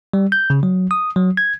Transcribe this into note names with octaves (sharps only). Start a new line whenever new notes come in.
G3
G6
C#3
F#3
D#6
F#3
G#6